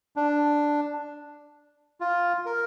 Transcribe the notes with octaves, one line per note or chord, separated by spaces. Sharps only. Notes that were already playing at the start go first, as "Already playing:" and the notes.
D4
F4
A#4